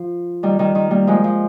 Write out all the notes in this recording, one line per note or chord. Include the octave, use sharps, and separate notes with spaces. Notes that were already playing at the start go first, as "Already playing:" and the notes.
Already playing: F3
D#3 G3
D#3 G3
D#3
G3 A#3
F3 G#3
F3